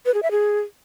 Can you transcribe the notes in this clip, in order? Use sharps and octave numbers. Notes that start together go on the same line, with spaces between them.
B4
G#4
E5
G#4